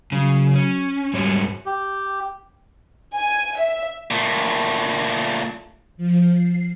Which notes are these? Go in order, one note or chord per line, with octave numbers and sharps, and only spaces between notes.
C#3 F#3
C#4
G#2 F#3 G3 C#5
G4
G#5
E5
A#2 A3
F3
C7